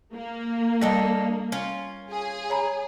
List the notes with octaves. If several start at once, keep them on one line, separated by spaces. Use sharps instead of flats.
A#3
G3 D4 A4 D#5
C#4 F4
G#4
C#5 A#5 B5